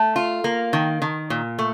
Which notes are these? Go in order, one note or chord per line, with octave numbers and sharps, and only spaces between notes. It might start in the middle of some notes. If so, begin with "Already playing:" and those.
Already playing: A3
F4
A#3
D#3
D#3
A#2
A3